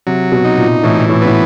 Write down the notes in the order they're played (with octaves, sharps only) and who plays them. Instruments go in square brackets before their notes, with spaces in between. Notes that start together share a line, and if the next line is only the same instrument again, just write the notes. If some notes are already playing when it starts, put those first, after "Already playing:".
[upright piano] C3 [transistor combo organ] F#3
[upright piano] B2
[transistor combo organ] D#4
[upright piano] A#2
[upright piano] A2 [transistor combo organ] E3
[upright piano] A2
[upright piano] A2 [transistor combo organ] B3